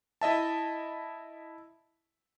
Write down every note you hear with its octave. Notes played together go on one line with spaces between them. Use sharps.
E4 D#5 E5 A5